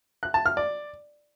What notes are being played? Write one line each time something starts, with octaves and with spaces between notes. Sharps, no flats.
F#6
A5
F6
D5